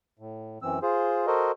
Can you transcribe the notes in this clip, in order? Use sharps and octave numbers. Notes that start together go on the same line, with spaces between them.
A2
F#2 E3 C4 E6
F4 G#4 C5
F#4 A4 A#4 C5 D#5